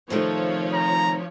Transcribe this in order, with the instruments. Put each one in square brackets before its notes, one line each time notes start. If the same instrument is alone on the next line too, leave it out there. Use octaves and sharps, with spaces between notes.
[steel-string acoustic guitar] C3 D#3 A3 [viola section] F3 C#5
[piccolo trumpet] A#5